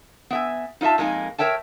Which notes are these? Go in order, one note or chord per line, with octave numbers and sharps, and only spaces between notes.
B3 E5 G#5
D#4 F4 D#5 E5 A5
F2 G#3 A#3 D#4 G#5
A#4 C#5 E5 G5 A5